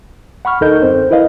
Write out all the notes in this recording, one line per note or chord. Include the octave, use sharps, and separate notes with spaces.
F#5 B5 C#6 F6
D2 D#4 A4 A#4 D#5 G6
F#2 C4 C5
E4 A#4 B4 D#5 F5